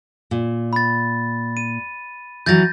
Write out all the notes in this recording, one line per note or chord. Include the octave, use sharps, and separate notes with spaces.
A#2
B5 A6
D#7
E3 F#3 G6 A6 A#6